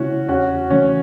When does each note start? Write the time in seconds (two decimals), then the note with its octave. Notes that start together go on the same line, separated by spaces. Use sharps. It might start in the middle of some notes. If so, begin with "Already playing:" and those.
Already playing: C#3 A3 C#4 E4 F#4
0.28 E2 C#4 F#4
0.70 C#3 E3 A3 C#4